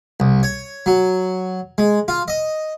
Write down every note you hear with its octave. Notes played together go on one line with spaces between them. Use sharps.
C2
C#5
F#3
G#3
F4
D#5